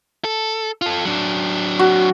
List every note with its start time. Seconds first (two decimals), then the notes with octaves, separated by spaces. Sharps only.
0.24 A4
0.82 F4 A4
1.05 F#3 D4
1.79 F#4